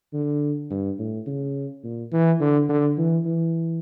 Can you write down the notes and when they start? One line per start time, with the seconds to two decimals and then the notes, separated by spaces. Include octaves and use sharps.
0.14 D3
0.71 G2
0.99 A2
1.27 C#3
1.84 A#2
2.12 E3
2.40 D3
2.69 D3
2.98 E3
3.25 E3